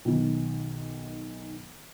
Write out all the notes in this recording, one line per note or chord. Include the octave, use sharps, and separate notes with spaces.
B1 D#3